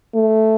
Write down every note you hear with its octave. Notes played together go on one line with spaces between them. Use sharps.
A3